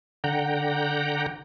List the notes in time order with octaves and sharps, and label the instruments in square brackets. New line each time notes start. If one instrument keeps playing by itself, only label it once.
[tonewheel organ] D3 F#5 G5 A#5